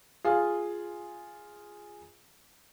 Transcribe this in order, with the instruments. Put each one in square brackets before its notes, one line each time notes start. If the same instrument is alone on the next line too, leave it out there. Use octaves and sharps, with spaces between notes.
[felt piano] F4 G#4